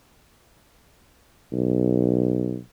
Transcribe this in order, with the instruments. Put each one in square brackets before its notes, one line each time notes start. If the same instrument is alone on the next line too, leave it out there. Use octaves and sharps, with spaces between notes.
[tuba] B1